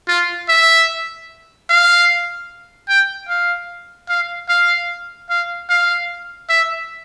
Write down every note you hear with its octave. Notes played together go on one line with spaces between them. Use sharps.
F4
E5
F5
G5
F5
F5
F5
F5
F5
E5